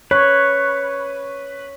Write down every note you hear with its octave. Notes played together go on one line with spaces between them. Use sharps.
B4 C#5